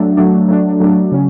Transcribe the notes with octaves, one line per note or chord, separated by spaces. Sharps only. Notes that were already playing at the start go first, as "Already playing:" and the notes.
Already playing: F#3 A3 D4
F#3 A3 D4
F#3 A3 D4
F#3 A3 D4
C#3 F#3 C#4